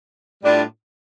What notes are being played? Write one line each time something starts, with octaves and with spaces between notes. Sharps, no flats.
A2 G3 D4 F4